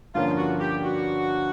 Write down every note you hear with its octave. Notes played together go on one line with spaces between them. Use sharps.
G2 D3 F3 A#3 C#4 F4
F#4
G4
F#4